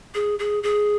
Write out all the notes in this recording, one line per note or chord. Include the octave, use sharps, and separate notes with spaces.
G#4
G#4
G#4